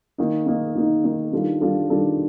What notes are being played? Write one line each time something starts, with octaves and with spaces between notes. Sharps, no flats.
D#3 A#3 D#4
D#3 A#3 D#4
D#3 A#3 D#4
D#3 A#3 D#4
D#3 G3 D4 F4 A4
D#3 G3 D4 F4 A4
D#3 G3 D4 F4 A4